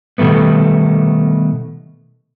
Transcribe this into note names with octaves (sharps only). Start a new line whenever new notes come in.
B2 D#3 G3 A3 B3